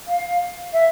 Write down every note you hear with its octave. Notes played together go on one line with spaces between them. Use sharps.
F5
E5